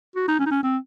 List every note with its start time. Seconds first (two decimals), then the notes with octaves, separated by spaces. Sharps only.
0.16 F#4
0.28 D#4
0.39 C#4
0.46 D#4
0.51 C#4
0.63 C4